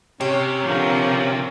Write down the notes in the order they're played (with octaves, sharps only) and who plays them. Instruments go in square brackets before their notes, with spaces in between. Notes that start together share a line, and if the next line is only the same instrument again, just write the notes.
[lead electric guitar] C3 [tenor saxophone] C#4 [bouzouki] G4
[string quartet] D3 F3 A#3